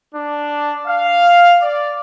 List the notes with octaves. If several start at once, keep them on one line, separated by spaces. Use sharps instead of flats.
D4
F5
D5